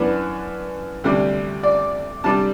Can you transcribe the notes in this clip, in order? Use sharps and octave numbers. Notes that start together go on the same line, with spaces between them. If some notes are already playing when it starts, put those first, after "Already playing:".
Already playing: F#2 E3 B3 D4 B4
D2 C3 G3 D4
D5
C3 G3 D4 A5